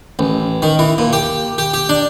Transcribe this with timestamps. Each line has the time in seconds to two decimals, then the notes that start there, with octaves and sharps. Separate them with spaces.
0.19 A1
0.62 D#3
0.79 E3
0.98 A#2
1.13 G4
1.58 G4
1.74 G4
1.89 D4